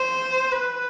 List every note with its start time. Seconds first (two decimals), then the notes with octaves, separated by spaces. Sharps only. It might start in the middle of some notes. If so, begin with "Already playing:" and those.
Already playing: C5
0.52 B4